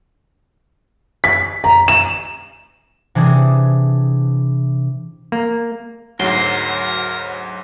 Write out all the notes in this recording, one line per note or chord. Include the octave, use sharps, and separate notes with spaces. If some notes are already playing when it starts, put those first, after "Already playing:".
B6
A#5
E7
C3 E3 D4 G#4
A#3
D2 G#2 F#3 A#4 C6